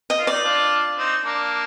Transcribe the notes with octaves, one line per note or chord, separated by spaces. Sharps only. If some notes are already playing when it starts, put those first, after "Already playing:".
D#5
F4
D#4 D5
D4 F4
C4 D#4
A#3 D4